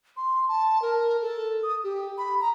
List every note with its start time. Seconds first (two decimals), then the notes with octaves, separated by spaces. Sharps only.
0.17 C6
0.48 A5
0.82 A#4
1.22 A4
1.63 D#6
1.84 G4
2.18 B5
2.41 A#5